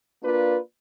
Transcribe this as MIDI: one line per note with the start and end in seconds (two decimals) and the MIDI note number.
0.23 0.58 58
0.23 0.58 62
0.23 0.58 65
0.23 0.58 71
0.23 0.58 74